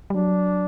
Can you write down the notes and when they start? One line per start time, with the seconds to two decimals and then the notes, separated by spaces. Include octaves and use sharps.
0.10 G3
0.15 F#3 D4